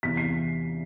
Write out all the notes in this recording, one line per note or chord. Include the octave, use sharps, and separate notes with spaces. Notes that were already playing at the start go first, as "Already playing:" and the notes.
E2 C3 E3 B6
C7